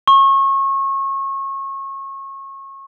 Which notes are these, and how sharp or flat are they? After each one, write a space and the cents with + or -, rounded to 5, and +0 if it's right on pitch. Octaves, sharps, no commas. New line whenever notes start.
C#6 -30